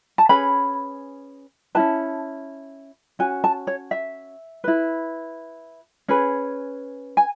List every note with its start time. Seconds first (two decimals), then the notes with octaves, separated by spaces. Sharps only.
0.18 A5
0.29 C#4 G#4 B4 B5
1.75 C#4 E4 B4 A5
3.19 C#4 F#4 G#5
3.44 A5
3.67 C#5
3.91 E5
4.64 E4 B4
6.08 C#4 G#4 B4
7.17 G#5